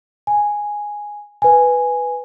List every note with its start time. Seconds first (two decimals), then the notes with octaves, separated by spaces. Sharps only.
0.27 G#5
1.42 B4 G#5